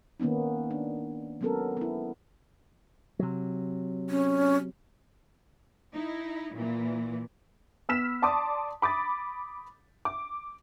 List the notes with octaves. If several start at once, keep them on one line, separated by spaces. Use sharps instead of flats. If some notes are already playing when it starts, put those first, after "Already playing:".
D#3 A#3 B3 C#4 D#4
D4
F#3 G#3 B3 C#4 A4 A#4
B3 E4
C3 F#3
C#4
D#4 E4
A#2 E3
B3 E6 F6 B6 E7
D5 A5 C6 D6 D#6
B5 D6 D#6 A6
D6